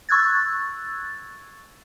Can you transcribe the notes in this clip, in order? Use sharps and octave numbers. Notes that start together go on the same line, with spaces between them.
C#6 E6 F#6 G#6 A6